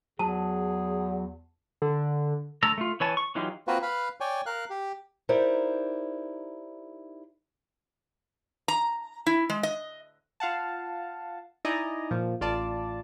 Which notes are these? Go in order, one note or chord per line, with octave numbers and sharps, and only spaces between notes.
E2 F#3 G#4 A5
D3
D3 A3 A5 A#5 E6
A3 F4
E3 B4 C#5 G#5 A5
C#6
E3 F#3 D#4 F4 G4
A#3 C4 F4 F#4 A#4 B4
B4 F5 B5
C#5 D5 G5 G#5
A#4 F5 F#6
G4
D#4 E4 G4 A#4 C5 D5
A#5
E4
G#3
D#5
F4 F5 F#5 A5
D#4 E4 D5 D#5 G#5 A#5
A#2 F3
A1 F4 D5 A5